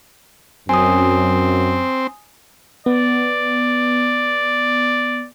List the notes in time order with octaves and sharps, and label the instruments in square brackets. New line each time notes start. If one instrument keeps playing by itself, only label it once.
[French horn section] F#2 [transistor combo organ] C4 [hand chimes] G#5 D#6
[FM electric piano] B3 [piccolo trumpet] D5